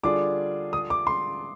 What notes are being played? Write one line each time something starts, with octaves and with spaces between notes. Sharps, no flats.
D3 G3 D4 F4 G#4 D6
D#6
D6
C6